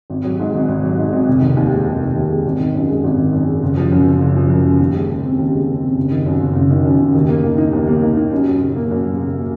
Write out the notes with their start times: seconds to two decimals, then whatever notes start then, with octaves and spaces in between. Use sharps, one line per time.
0.10 G#1
0.25 F#3
0.40 G#2
0.54 G#1
0.68 G#1
0.83 F#3
0.98 G#2
1.13 G#1
1.28 F1
1.42 D#3
1.57 D#2
1.72 G#3
1.86 F1
2.01 D#3
2.16 D#2
2.30 G#3
2.45 G#1
2.60 D#3
2.75 F#2
2.89 G#3
3.04 G#1
3.18 D#3
3.33 F#2
3.47 G#3
3.63 F#1
3.77 F3
3.92 F#2
4.06 F#1
4.21 F#1
4.36 F3
4.50 F#2
4.65 F#1
4.79 D#2
4.95 G#3
5.09 C#3
5.24 C4
5.38 D#2
5.53 G#3
5.68 C#3
5.83 C4
5.97 F#1
6.11 D#3
6.26 F#2
6.40 F#1
6.56 F#1
6.70 D#3
6.85 F#2
7.00 F#1
7.15 D#2
7.29 A#3
7.44 D#3
7.58 D#4
7.73 D#2
7.87 A#3
8.03 D#3
8.17 D#4
8.32 F#2
8.46 F#3
8.61 C#3
8.75 A#3
8.91 F#2
9.05 F#3
9.20 C#3
9.34 A#3